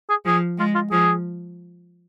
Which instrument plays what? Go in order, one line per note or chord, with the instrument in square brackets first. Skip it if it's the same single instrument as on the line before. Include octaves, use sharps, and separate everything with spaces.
[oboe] G#4
[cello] F3 [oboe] G#4
[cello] G#3 [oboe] F4
[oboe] F4
[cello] F3 [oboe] G#4